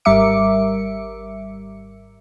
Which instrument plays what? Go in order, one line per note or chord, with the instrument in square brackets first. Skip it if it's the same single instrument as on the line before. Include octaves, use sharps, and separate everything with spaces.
[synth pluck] G#1 G3 A#4 E5 D6 C#7